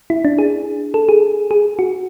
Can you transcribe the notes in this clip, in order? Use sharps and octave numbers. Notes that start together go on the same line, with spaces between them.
E4
D4
G#4
A4
G#4
G#4
F#4